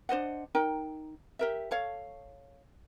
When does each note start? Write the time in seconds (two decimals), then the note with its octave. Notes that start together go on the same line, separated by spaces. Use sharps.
0.09 D4 C5 D#5 F#5
0.55 D#4 A#4 G5
1.39 G4 A#4 E5
1.71 A4 C#5 F5